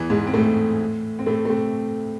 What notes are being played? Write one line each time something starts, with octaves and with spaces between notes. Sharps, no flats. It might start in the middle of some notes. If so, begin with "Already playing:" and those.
Already playing: E2 E3
G#2 G#3
C4
A2 A3
C4
A2 A3
A3
C3 C4